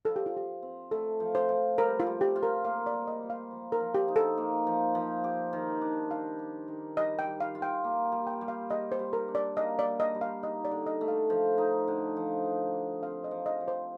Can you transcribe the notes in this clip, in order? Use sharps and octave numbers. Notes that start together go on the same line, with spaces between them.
F3 A4
G4
F4
F3 G4
C4
A3 A4
F3
C5
F3
G3 A#4
F4
G3
G4
F4
A#4
A#3 F5
D5
G3
D#5
G3
F5
F3
A#4
F3
G4
D#4
A4
A#3
F3
F3
G4
D#3
D4
G3 F5
G4
D#3
G3 D#5
G5
G3
F5
F4
G5
A#3
G5
G3
G5
G3
F5
G3 D#5
C5
G3
A#4
D4
D5
A#3 D#5
D5
G3
D#5
G3
F5
D#4 D#5
D5
D3
D#5
A3
F5
F3
D#4
D3
F3
F3
G4
C4 F5
D#5
F3
D#5
F3
C5